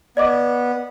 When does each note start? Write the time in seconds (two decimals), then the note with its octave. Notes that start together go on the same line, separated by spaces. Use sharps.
0.17 B3 D5 D#5 D6